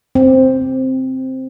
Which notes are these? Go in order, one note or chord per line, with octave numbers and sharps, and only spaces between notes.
C4